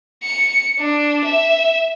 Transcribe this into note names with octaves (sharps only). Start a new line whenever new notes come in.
C#7
D4
E5